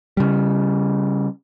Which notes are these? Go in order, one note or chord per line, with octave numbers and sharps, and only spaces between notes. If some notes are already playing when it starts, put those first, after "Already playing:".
C#3 G3